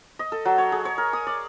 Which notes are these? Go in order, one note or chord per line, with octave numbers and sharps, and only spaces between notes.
D#5
A4
F#3
C#5
G#4
C#5
A#4
D#6
D5